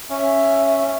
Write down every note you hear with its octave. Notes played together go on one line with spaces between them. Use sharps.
C#4 E5